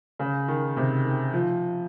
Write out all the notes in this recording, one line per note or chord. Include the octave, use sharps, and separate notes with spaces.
C#3
D#3
C3
D#3
F3